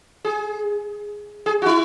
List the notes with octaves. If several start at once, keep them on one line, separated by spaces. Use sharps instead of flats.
G#4
G#4
F#4
E4